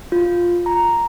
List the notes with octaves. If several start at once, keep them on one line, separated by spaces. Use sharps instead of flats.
F4
A#5